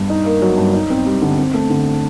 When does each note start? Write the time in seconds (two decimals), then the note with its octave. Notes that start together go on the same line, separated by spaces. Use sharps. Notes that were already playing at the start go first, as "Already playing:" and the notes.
Already playing: G2
0.10 D#4
0.26 A#3
0.42 F#3
0.58 G2
0.74 D#4
0.90 C4
1.06 G3
1.22 D3
1.38 C4
1.54 A3
1.70 D3